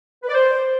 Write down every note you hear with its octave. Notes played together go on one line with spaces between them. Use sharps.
B4
D5
C5